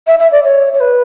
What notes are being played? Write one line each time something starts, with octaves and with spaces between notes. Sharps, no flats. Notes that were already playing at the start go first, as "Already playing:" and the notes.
E5
E5
D5
C#5
C#5
B4